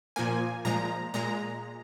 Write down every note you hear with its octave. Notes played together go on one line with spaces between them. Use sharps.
A#2 F3 A#3 G#5
A#2 F3 G#3 A#5
A#2 G#3 A#5